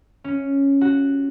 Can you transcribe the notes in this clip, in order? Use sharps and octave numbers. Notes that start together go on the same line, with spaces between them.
C#4
F#4